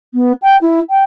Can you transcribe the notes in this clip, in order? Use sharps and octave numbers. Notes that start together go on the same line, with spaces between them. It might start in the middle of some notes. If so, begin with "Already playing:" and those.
B3
G5
E4
G5